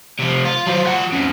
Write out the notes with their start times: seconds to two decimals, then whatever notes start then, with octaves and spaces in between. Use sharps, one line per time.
0.19 C3 F3
0.45 F4
0.67 F#3 C5
0.86 F3 F#5
1.12 F2 C#3